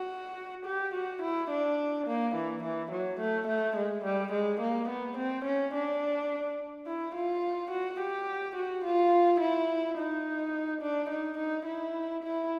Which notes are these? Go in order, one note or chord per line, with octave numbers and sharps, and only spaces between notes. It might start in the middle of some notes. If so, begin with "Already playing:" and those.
Already playing: F#4
G4
F#4
E4
D4
A#3
E3
E3
F#3
A3
A3
G#3
G3
G#3
A#3
B3
C4
C#4
D4
E4
F4
F#4
G4
F#4
F4
E4
D#4
D4
D#4
D#4
E4
E4